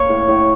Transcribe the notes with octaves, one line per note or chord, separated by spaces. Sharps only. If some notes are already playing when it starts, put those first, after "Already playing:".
Already playing: A#3 C#5
A2
A2